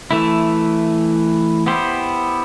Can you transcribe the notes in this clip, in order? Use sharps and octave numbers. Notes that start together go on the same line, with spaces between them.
E3 A3 E4
B3 E4 G4 C5